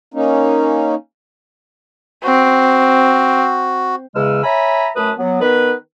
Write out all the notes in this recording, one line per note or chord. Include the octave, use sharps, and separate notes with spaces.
A#3 C#4 D#4
C4 F#4
E2 C#3 G#3 E6 F6
C#5 E5 G#5 A#5 B5
F#2 A3 B4 A5 D#6
F#3 B3
D#3 B3 B4